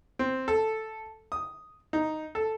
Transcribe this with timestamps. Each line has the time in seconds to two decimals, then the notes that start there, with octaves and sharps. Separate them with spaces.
0.19 C4
0.48 A4
1.32 D#6
1.93 D#4
2.35 A4